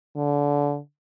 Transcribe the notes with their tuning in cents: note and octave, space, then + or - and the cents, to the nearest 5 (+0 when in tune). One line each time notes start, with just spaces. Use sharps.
D3 -25